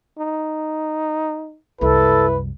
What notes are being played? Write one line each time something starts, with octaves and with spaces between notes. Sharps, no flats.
D#4
C2 F#2 E4 A4 B4